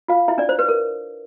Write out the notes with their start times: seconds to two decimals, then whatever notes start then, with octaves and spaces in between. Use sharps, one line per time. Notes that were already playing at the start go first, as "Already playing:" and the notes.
0.08 F4 F5
0.28 E4 E5
0.38 D4 D5
0.49 C5
0.59 B4
0.69 A#4